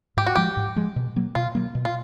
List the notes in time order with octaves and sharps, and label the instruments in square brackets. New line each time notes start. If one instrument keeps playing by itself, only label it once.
[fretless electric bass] G#2 [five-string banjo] G4
[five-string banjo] F#4
[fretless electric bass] F3 G#3 [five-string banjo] G4
[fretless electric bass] G#2
F3 G#3
B2
F#3 A#3
[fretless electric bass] B2 [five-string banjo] F4
[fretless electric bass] F#3 A#3
B2
[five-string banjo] F4